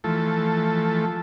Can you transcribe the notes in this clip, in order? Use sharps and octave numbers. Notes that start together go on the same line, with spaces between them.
E3 F3 A3 A4